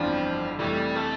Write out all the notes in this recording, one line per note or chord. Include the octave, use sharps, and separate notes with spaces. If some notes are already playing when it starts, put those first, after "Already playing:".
Already playing: G1 F2 E3 F3 G3 D4
F1 F2 E3 G3 A3
A3